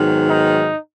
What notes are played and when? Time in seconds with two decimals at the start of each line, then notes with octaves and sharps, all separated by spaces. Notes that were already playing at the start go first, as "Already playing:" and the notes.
Already playing: G#2 D#3 F#3 B3
0.30 D#4